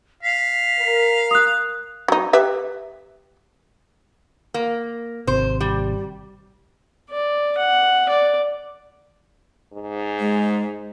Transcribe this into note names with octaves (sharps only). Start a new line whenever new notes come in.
F5 B6
A#4
D#6 F#6
F#3 D#4
G4 B4 E5
A#3
G#1 C3 C5
G3
D5
F#5
D5
G#2
G#3